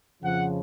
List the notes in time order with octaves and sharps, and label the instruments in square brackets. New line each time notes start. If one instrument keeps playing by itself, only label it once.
[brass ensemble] F2 C#3 F3 F#5